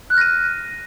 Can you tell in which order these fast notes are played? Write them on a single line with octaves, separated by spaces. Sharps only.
F#6 F6 A#6 D#7